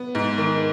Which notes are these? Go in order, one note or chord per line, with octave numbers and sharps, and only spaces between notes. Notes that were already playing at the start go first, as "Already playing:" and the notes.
Already playing: B3
G#2
D#3